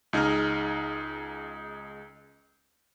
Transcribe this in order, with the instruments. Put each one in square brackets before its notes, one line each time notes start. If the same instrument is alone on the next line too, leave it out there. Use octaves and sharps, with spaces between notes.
[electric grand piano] C#2 D#4 G#4 A#5 F6